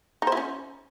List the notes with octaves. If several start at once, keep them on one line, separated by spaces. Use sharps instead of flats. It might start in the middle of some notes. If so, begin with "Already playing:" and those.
D#4
C5
E4
C#4